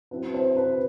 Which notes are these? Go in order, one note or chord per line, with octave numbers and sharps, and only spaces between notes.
F#3 C4 E4 B4
C5
B4